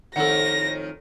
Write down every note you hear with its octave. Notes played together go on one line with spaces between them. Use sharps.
F2 A2 D#3 A4 F#5 A#6